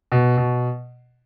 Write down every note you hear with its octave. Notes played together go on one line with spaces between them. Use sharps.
B2
B2